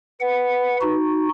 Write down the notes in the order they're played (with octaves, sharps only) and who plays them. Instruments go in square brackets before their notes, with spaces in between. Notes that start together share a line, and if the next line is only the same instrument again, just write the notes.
[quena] B4 [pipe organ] F#5
[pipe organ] D#4 F#4